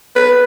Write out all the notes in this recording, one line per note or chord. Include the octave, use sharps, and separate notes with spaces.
B4